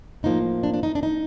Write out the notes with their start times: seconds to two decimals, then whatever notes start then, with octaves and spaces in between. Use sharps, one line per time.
0.23 A2 F3 A#3 D#4
0.63 D4
0.74 D4
0.83 D#4
0.95 D4
1.03 D#4